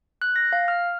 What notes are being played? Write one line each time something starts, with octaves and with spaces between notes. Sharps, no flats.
F#6
A#6
F5
F6